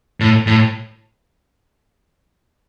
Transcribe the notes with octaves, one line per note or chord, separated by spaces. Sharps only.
A2
A2